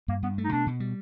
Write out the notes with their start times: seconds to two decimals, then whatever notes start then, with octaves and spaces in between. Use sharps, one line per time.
0.08 G2 A#3
0.23 G2 B3
0.38 A3
0.44 D#4
0.52 B2 D4
0.67 B2
0.80 G3